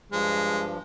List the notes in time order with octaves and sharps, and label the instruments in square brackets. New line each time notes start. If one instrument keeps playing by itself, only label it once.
[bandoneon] G2 F3 [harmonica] G#3